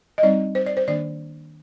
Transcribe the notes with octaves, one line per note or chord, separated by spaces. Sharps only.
D#5
G3 C4 D#4 D5
C5
D5
C5
D#3 A#3 D4 D5